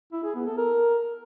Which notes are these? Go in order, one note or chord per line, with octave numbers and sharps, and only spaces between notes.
E4
G#4
B3
A4
A#4